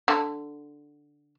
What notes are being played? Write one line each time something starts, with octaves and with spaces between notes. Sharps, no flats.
D3